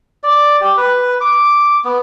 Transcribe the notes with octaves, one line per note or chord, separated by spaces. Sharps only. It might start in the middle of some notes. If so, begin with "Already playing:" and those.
D5
G4
B4
D6
B3